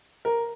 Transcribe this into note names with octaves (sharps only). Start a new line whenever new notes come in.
A#4